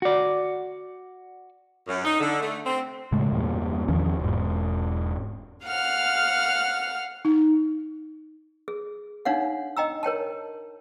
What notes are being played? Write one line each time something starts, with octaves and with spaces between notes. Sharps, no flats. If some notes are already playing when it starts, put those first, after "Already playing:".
F#4 D5
F#2
D#4
D3
A3
C4
A2 C#3 G#3 A3
E2 G2 A#2
E2 D#3 F3 C#4
E1 G#2
F5 F#5 F6
D#4
G#4
D4 D#4 C#5 F5 F#5
D#5 G5 A#5 E6
A#4 C#5 G5 A5